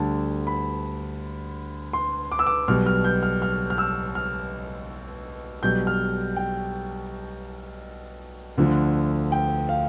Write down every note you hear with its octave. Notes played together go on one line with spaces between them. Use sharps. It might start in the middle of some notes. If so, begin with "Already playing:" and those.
Already playing: D2 D3 G3 A5
B5
C6
D6
E6
D6
B1 B2 G3 F6
F6
G6
F6
F6
F6
E6
F6
B1 B2 G3 G6
F6
G5
D2 D3 F3
G5
F5